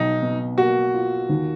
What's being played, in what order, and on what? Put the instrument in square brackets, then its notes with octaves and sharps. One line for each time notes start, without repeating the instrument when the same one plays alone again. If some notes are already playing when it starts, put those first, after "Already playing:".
Already playing: [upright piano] B1 [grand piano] D#4
[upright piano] B2
[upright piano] A#3 [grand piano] F#4
[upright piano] F4
D#2